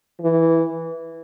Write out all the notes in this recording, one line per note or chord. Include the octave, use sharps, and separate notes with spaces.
E3